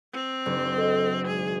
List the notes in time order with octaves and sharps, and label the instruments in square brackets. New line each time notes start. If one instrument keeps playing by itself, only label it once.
[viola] C4
[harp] F#1 D4
[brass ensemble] A4 D#5
[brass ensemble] G#1 [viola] G#4